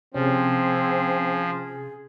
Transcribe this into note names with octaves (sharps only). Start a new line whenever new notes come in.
C3 F3 C4 C#4 G#4